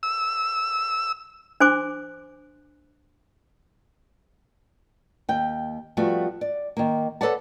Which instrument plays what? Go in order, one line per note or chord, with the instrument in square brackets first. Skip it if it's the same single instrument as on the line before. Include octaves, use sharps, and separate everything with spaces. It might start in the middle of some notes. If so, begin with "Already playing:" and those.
[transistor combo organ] E6
[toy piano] D4 C5 G#5 C6 D6
[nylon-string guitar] D#2 G5
F3 G3 A3 B3 F#4
D5
D#3 A#3
A4 B4 C#5 D5 F#5 A5